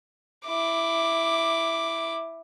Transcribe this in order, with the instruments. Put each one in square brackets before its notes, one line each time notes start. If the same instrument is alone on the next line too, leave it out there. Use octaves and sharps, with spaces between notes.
[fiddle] E4 D6